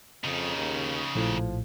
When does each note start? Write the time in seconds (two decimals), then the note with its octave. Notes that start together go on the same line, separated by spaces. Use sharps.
0.24 F2 C#3 D#4
0.56 D#2
1.15 A#1 A2 F3